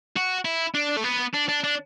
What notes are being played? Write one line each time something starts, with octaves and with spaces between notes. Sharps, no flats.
F#4
E4
D4
A3
B3
D4
D4
D4